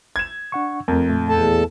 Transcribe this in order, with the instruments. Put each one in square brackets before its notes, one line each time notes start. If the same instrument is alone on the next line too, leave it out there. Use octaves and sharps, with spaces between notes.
[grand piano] G#6 E7
[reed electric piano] D4 F#5 C#6
[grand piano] F2 [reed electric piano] A3 A#4
[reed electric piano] A#2 A3
[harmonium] E2 A4 A5